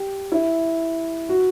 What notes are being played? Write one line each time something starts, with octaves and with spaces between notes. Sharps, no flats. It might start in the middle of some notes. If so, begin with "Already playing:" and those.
Already playing: G4
E4
F#4